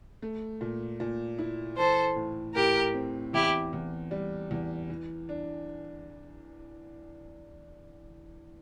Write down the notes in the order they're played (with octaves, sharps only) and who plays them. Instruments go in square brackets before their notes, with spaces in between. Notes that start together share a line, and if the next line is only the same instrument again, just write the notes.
[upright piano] A3
A#2
A#2
E4
[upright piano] E3 [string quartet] A4 C5
[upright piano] A2
[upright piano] A2 [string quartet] G4 A#4
[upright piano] C4
[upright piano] E2 [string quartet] E4 G4
[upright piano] E2
G3
E2
E3
D4